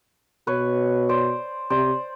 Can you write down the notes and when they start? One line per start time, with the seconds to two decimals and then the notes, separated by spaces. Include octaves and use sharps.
0.47 B2 B4 C#5
1.09 C5 D5
1.70 C3 C5 D5